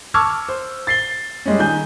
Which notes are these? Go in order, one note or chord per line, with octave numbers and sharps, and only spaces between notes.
A5 C#6 D6 E6 F6 G#6
C5
A6 C7 G7
G3 G#3 C#4
D#3 G#5 G6